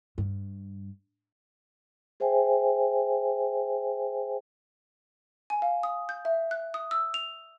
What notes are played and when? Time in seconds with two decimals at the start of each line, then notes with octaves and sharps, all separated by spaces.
0.18 G2
2.20 G#4 C5 E5 G5 G#5
5.50 G#5
5.62 F5
5.83 D#6
6.09 G6
6.25 E5
6.51 F#6
6.74 D#6
6.91 E6
7.14 F7